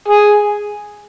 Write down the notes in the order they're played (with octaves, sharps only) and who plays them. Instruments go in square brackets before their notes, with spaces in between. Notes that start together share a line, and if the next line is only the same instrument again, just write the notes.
[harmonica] G#4